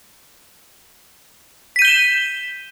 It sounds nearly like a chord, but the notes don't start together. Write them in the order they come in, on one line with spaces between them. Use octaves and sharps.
B6 D#7 G6 G7 E7